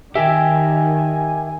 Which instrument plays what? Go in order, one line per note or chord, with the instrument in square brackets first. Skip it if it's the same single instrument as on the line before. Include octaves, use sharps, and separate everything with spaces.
[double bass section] D#3 [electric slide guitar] G4 A#4 G5 [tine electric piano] E5 [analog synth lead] G#5